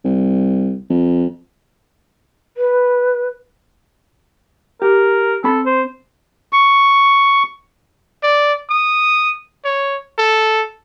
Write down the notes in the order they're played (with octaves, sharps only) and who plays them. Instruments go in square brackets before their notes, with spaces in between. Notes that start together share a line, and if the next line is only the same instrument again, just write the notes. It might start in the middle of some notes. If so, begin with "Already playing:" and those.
[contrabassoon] C2
F2
[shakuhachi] B4
[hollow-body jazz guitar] G4 [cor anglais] A#4
[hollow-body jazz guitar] C4 B5 [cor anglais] A4
[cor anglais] C5
[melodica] C#6
[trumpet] D5
D#6
C#5
A4